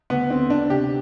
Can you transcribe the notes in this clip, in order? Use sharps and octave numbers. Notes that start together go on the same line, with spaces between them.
D2 B3
D3 C4
D2 D4
C3 G4